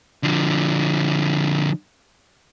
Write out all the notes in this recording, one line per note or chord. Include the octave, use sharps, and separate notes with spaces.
D3 F3